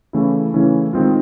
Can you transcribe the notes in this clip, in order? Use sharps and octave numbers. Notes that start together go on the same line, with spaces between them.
C#3 E3 A3 C#4 E4
C#3 E3 A3 C#4 E4
D#3 G#3 C4 F4